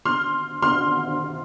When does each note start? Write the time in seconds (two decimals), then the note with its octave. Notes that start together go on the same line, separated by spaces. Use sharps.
0.05 C6 F6
0.62 C6 F6